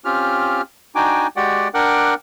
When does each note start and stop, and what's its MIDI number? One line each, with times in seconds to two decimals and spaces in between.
0.05 0.61 60
0.05 0.61 61
0.05 0.61 65
0.05 0.61 67
0.05 0.61 89
0.95 1.27 62
0.95 1.27 63
0.95 1.27 66
0.95 1.27 79
0.95 1.27 80
0.95 1.27 86
1.36 1.68 56
1.36 1.68 66
1.36 1.68 67
1.36 1.68 74
1.36 1.68 78
1.36 1.68 79
1.74 2.14 62
1.74 2.14 70
1.74 2.14 78
1.74 2.14 79
1.74 2.14 86
1.74 2.14 90